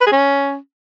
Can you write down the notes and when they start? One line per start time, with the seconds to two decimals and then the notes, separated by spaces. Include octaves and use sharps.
0.01 B4
0.06 G#4
0.12 C#4